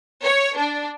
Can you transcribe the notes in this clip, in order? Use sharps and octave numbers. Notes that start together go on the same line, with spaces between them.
C#5
D4